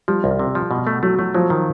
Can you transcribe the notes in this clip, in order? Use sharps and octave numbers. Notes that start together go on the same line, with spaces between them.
F3 G3
C2
C3
F3
B2
A3
F#3 A3
F#3 A3
F3 F#3
D#3